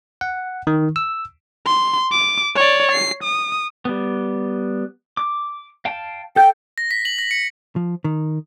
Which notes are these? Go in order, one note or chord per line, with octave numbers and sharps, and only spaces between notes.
F#5
D#3
E6
C6
D6
C#5 D5
C7
D#6
G3 B3
D6
F5 G5 A5
A4 G5 G6
A#6
B6
F#7
A#6
C#7
F3
D#3